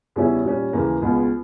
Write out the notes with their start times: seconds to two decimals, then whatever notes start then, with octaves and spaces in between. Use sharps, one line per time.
0.16 E2 C#3 G3 C#4 E4
0.44 A#2 G3 C#4
0.73 D#2 C#3 E3 A#3
1.02 C#2 B2 G#3 B3